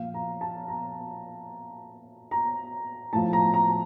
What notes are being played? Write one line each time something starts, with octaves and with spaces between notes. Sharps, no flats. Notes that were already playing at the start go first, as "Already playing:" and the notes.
Already playing: A#2 F3 F5
A#5
A5
A#5
A#5
A2 F3 A5
A#5
A#5